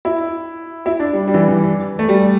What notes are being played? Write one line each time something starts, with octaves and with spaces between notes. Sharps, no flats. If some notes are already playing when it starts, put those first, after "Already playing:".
E4
E4
D4
G3
G3
E3
E3
A3
G3